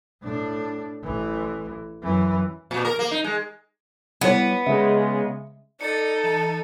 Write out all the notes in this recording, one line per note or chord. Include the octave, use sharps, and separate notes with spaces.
A2 D4
A1 E3
F#2 E3
A#2
A#4
A#3
D#4
G#3
G3 B3 E4 C#5
C#3 G#3 E5
D#4 A4 D5 A6 C#7
E3 A5